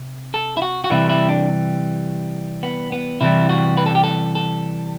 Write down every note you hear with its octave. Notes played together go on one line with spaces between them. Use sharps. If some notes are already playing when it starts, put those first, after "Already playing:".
Already playing: C3
A4
E4
F#4
F#4
C3 E3 G3 E4
E4
D4
B3
B3
C3 E3 G3 E4
F#4
B4
A4
G4
A4
A4